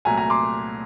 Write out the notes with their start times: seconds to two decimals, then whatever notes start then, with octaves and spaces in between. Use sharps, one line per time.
0.05 C2 A#2 F#3 A3 G#5 A#5
0.17 G#5 A#5
0.30 C6 D6